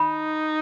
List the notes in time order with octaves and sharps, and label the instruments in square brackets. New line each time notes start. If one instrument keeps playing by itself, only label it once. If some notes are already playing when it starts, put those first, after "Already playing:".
Already playing: [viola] D#4 [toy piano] B5